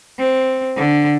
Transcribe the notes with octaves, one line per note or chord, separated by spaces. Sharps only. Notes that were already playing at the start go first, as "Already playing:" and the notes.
C4
D3